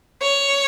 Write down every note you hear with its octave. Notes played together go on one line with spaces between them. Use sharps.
C#5